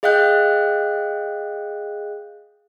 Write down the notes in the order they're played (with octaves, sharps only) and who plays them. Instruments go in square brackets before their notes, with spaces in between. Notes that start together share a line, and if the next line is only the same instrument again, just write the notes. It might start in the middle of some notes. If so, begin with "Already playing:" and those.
[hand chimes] G#4 D#5 F5 G5 F#6 G6